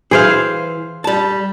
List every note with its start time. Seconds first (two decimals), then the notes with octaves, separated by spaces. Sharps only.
0.11 E3 G#4 C5 F5
1.04 G3 A5